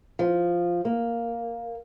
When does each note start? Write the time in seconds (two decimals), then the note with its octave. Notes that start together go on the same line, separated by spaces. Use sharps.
0.19 F3
0.85 A#3